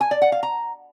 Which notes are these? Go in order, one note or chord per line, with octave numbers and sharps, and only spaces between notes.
G#5
D5
F#5
F5
A#5